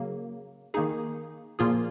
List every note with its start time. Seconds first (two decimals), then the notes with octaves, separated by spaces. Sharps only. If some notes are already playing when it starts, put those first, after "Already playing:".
Already playing: C#3 F#3 A#3
0.74 D#3 A#3 D#4 G#4
1.59 A#2 F3 A#3 F4 G#4